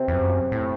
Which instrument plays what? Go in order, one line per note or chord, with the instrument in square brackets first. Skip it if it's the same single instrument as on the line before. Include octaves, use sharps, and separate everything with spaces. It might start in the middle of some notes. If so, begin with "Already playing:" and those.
Already playing: [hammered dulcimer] C3
[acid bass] E2
F#2
A2